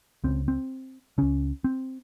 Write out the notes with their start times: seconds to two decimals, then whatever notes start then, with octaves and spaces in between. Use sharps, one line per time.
0.24 C#2 C#3 C4
0.48 C4
1.18 C#2 C#3 C#4
1.64 C4